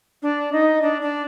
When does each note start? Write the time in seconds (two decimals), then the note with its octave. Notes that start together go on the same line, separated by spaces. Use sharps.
0.22 D4
0.53 D#4
0.82 D4
1.02 D4